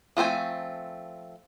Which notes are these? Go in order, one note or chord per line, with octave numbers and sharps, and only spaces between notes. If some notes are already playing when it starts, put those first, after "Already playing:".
F3 A3 C4 G#5